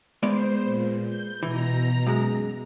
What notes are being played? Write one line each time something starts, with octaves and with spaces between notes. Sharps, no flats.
G#3 B3 C5 D5
A#2
G6
B2 E3 A#5
F#2 G#3